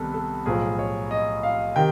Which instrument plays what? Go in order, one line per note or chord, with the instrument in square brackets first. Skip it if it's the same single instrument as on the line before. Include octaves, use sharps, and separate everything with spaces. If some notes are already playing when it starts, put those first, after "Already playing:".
Already playing: [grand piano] C2 C3 D#3 B3 A4
A4
B1 A2 F3 G#4
C#5
D#5
F5
C3 D#3 G5